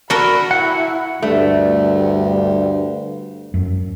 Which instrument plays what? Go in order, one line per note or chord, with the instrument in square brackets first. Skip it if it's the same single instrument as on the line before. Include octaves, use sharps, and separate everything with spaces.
[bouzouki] F#4 [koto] A4 A#4 [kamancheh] B5
[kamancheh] E4 [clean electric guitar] F#5
[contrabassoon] D2 [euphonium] G2 [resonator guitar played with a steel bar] A3
[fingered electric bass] F#2